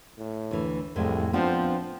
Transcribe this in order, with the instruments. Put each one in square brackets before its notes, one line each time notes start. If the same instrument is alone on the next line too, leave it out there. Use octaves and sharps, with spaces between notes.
[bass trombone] A2
[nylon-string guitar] D2 E3
[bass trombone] C2 [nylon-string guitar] F2 A2 G#3
[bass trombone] F3 [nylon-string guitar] B3 C4 D4